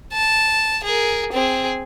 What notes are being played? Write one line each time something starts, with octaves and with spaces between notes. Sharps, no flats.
A5
G#4 A#4
C4 G#4